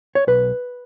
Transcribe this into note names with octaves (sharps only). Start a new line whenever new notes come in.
C#5
B1 B4